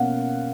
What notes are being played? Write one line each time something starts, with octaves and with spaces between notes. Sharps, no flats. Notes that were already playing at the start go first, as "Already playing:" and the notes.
Already playing: B2 A#3 C#4 F5 F#5